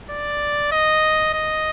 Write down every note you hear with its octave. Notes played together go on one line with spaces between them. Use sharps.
D5
D#5
D#5